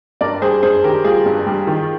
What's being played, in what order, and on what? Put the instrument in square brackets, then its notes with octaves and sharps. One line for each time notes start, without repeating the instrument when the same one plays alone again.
[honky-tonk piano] G2 [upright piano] A#4 D5
[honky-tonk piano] G3 [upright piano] G#4 C5
[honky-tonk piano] G2 [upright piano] G#4 C5
[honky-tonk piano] D#3 [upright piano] G4 A#4
[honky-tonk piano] G3 [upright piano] F4 G#4
[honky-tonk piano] G2
G3
D#3